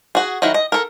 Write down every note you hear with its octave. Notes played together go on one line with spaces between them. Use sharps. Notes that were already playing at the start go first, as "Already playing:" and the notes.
F#4 G#4
D#3 F#3 E4 F#4
D#5
A4 A#4